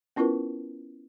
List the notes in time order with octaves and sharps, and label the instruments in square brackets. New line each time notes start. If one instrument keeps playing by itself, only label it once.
[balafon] B3 C#4 E4 F4 A#4 B4